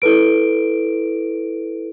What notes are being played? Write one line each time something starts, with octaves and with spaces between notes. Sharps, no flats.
E4 A4 B4 D7